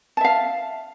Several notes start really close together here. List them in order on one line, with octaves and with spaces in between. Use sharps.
A5 E5 F5